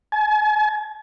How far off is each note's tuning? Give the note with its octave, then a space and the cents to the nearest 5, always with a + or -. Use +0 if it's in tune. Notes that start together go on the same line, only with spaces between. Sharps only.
G#5 +45